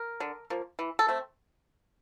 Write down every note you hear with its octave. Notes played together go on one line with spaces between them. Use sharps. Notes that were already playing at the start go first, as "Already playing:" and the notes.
Already playing: A#4
D3
F3 A#3
E3
A4
A3 C4